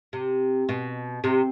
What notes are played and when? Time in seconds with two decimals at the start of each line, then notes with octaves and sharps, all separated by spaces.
0.13 C3
0.69 B2
1.24 C3